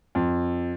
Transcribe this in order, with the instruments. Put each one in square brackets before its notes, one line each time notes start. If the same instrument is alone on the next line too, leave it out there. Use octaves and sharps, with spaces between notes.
[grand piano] F2